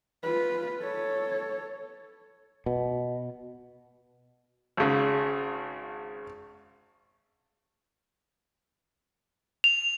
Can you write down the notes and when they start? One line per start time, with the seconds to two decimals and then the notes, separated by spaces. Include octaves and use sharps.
0.23 F4 B4
0.82 A4 C#5
2.66 B2
4.77 G#1 C#3
9.64 F7